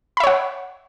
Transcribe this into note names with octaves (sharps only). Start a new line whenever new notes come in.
C#5 E5 F#5 B5